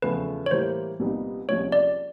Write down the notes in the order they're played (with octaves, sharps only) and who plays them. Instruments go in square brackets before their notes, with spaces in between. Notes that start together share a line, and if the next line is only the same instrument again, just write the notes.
[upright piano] E2 C#3 F3 A3 [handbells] B4
[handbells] C#5
[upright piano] A2 E3 G3 A#3 [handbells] C5
[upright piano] C2 A#2 G3 B3 D#4
[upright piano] C2 A#2 F3 G#3 C#4 [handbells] C#5
[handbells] D5